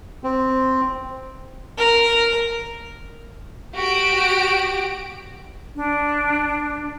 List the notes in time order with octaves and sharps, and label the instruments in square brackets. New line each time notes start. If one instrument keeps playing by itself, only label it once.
[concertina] C4
[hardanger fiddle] A#4
[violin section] F#4 G4 D7
[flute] D4